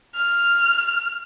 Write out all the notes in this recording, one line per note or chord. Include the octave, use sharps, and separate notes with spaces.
F6